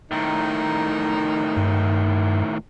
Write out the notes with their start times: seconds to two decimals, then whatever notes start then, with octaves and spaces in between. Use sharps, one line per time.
0.11 A2 D#3 D#4
1.57 G2